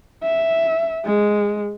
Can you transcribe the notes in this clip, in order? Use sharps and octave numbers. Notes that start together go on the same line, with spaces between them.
E5
G#3